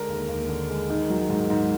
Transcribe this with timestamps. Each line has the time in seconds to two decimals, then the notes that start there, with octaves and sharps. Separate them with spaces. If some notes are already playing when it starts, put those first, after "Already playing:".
Already playing: D3 G#3 A#4 A#5
0.09 D#2
0.28 D#2
0.49 D3
0.69 G#3
0.90 D#3
1.10 F#3
1.30 G#2
1.50 G#2